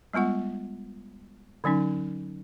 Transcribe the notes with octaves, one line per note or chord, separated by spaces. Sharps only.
G3 G#3 B3 F4 F#5
D3 F#3 C#4 D#4